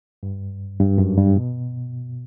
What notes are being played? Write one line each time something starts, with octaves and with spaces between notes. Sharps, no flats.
G2
G2
F#2
G2
B2